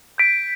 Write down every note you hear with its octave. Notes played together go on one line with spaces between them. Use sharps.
G6 B6 D7